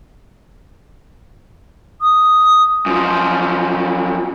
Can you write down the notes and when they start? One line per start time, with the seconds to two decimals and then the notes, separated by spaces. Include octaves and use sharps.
2.02 D#6
2.86 F#2 F3